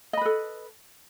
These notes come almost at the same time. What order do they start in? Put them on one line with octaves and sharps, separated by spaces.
D#5 B5 B4 A4